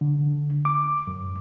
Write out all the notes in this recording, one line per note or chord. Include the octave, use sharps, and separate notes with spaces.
D3
D6
F#2